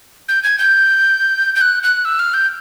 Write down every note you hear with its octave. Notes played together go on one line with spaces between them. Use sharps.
G6
G#6
G6
G6
F#6
F#6
E6
F6
G6